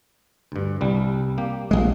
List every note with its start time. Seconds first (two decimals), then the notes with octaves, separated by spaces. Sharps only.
0.52 D2 G2
0.81 C2 G3
1.38 A#3 G4
1.71 A#1 G#3